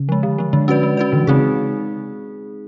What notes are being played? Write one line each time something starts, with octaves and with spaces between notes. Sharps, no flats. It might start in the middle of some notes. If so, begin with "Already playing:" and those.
Already playing: C#3
F3 G#3
D3
F3 G#3
D3 G#3
C#4 F#4 B4 D5
G#3
C#4 F#4 B4 D5
D3 E3
C#3 G#3 C4 D#4 G#4